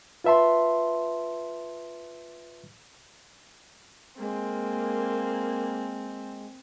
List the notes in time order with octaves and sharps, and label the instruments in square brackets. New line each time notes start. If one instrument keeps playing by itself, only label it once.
[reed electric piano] F4 B4 E5 A5 C6
[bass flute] G#3 [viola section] A#3 [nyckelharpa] C4